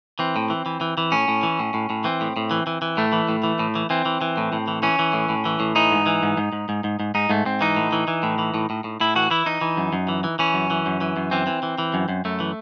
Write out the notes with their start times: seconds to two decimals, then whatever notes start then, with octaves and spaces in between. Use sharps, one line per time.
0.19 E3 C4
0.36 A2
0.50 E3
0.66 E3
0.81 E3
0.98 E3
1.12 A2 C#4
1.28 A2
1.43 E3
1.59 A2
1.74 A2
1.90 A2
2.04 E3 C4
2.21 A2
2.36 A2
2.51 E3
2.67 E3
2.82 E3
2.97 A2 A3
3.13 E3
3.29 A2
3.43 E3
3.59 A2
3.75 E3
3.90 E3 C4
4.05 E3
4.21 E3
4.37 A2
4.53 A2
4.68 E3
4.83 E3 C#4
4.99 E3
5.13 A2
5.29 A2
5.45 E3
5.60 A2
5.76 E3 D#4
5.92 G#2
6.06 E3
6.23 G#2
6.37 G#2
6.53 G#2
6.69 G#2
6.84 G#2
7.00 G#2
7.15 G#2 D#4
7.30 G#2 A3
7.45 G#2 C4
7.61 E3 D#4
7.76 A2
7.92 E3
8.08 E3
8.23 A2
8.39 E3
8.54 A2
8.70 A2
8.84 A2
9.00 A2 E4
9.16 E3 F#4
9.31 E3 E4
9.46 E3 D#4
9.61 E3
9.77 F#2
9.93 F#2
10.09 E3
10.24 E3
10.39 E3 C#4
10.54 F#2
10.70 E3
10.86 F#2
11.01 E3
11.17 F#2
11.31 E3 C4
11.47 E3
11.63 E3
11.78 E3
11.94 F#2
12.09 F#2
12.25 F#2 A3
12.40 E3